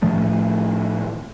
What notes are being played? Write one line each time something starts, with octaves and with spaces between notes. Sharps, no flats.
A2 D#3 F3 A3